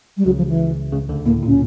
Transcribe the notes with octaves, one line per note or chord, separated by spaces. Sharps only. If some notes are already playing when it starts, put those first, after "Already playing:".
G3
C#2 C#3 F#3
F3
E3
C#2 C#3
D2 D3
A2 A#3
A#2
C#4